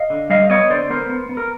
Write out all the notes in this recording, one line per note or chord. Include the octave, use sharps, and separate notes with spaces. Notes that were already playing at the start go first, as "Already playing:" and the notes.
Already playing: D#5 F5
D3
G3 D#5 F5
B3 C#5 D#5
D3 C5 D5
B3 A#4 C5
B3
B3
A#4